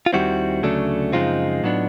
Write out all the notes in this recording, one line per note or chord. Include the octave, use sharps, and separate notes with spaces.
F4
D#2 D#3 G3 C4 E4 F#4
D2 C#3 F#3 A3 D4
F#2 C#3 F3 G#3 C4 D#4 F4
A2 F#3 B3 D4